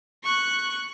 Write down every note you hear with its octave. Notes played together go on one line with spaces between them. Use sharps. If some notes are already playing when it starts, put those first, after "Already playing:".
C#6 F#6